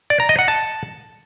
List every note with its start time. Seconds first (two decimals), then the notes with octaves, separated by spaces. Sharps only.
0.10 D5
0.20 A#5
0.29 D#5
0.39 F#5
0.48 A5